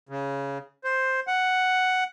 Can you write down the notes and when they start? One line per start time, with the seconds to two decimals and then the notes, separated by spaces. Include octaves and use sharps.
0.09 C#3
0.84 C5
1.27 F#5